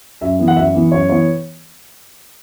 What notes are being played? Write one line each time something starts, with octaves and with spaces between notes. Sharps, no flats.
F#2 E5
E3 B3
F#5
F#2 E5
E3 B3
F#2 C#5
E3 B3 C#5